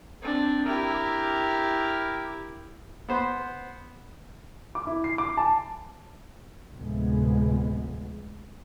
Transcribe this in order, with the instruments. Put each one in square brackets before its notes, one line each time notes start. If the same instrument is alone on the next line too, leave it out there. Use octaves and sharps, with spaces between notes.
[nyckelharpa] C4 D4
[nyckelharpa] E4 G4 [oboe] A#4
[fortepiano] B3 C5
[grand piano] D6
E4
C7
D6
A5
[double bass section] D2 A2 C3 F3 G#3 B3